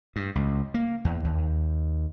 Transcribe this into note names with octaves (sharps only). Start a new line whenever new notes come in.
G2
C#2
A#3
E2
D#2